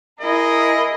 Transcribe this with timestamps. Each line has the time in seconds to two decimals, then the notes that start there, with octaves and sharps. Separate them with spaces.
0.21 E4 G#4 A#4 D#5